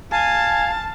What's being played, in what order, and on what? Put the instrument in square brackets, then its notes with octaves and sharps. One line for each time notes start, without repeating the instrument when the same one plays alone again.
[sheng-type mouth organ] F5 [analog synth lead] G#5 [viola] A5